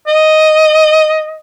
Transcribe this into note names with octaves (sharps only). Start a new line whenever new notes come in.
D#5